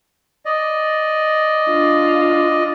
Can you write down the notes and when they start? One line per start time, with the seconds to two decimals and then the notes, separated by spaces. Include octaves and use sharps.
0.45 D5 D#5
1.68 D4 F4